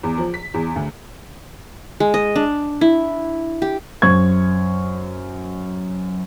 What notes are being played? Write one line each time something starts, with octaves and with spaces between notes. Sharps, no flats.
E2
F3
B6
E2
D2
G#3
D#5
D4
E4
G4
F#2 C5 C#6 G#6